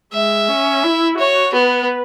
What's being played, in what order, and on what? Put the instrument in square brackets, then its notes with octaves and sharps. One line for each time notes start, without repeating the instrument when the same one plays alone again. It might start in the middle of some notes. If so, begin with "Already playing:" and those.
[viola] G#3 [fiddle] E5
[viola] C#4
E4
[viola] F#4 [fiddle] C#5
[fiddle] B3 [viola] B4